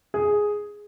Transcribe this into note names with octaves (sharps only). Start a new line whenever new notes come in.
G#4